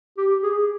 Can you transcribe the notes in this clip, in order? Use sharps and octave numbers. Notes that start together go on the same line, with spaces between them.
G4
G#4